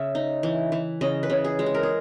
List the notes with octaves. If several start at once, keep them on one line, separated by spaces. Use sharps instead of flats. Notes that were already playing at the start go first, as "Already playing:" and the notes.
Already playing: C#3 E5
D#4
E3
E3
C#3 D#5
B4
C#3
G#4
G#3
G#4
A#4
G#4